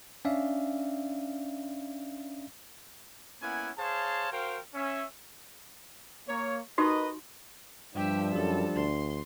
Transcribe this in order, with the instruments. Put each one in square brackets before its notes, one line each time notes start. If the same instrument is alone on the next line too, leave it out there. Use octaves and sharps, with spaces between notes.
[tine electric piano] C#4 D4 D5 E5 F5
[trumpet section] A#3 B3 C#4 E4 F#5 G#5
G#4 C5 C#5 F5 A5
F#4 A#4 C5 F5 G5
C#4 E5
[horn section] A#3 C#5
[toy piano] D#4 F#4 G4 [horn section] A#4 B4 D#5
[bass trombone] G2 [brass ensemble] F3 G3 [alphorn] D4 [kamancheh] G4 E5
[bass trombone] F#2 [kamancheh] A4
[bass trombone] D2 [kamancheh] C6